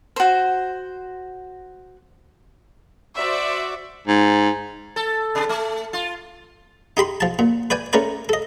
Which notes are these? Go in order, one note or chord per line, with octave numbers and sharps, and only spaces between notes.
F#4 C5
F#4 C5 D5 E5
G#2
A4
C3
A3
F4
D#4 G4 B5 C6
F3 A5
A#2
B4 D5 G5 G#5
A3 C#4 A#4 B4 D5
A4 D#5